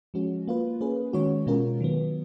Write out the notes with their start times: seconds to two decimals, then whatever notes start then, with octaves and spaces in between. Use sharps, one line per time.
0.14 F3 G#3 C#4 F#4
0.48 A#3 F4 B4
0.81 A#3 C#4 G#4 B4
1.13 D#3 G#3 C#4 F#4 C#5
1.47 B2 G#3 C#4 F4 A#4
1.80 D#3 F#3 B3